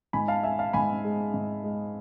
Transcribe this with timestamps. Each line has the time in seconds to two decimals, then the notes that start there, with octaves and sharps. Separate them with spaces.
0.13 G#2 G#5 B5
0.28 F5 A5
0.43 G#3 E5 G#5
0.59 F5 A5
0.73 G#2 G#5 B5
1.05 G#3
1.34 G#2
1.64 G#3